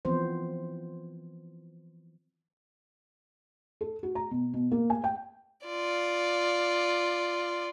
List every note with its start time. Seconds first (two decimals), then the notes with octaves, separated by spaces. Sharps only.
0.05 E3 F3 B3 C4 C5
3.81 A4
4.03 F#4
4.15 A#5
4.31 B2
4.54 B2
4.71 A#3
4.90 G#5
5.04 G5
5.66 F4 D5